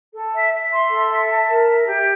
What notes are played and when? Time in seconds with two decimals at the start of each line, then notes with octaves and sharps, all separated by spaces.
0.13 A4
0.32 E5
0.52 E5
0.71 C6
0.90 A4
1.09 E5
1.28 A5
1.48 A#4
1.67 E5
1.86 G4